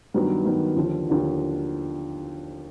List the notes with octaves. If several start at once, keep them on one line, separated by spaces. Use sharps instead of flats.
G2 D#3 F#3 B3
G2 D#3 F#3 B3
D#2 D3 F3
D#2 D3 F3